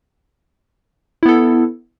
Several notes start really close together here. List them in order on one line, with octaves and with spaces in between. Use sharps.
E4 B3 A4